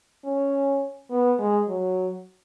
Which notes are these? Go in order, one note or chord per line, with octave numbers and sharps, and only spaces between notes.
C#4
B3
G#3
F#3